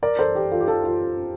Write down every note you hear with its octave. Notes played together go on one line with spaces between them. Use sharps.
A#4 D5
A4 C5
G4
F4 A4
G4
F4 A4
F4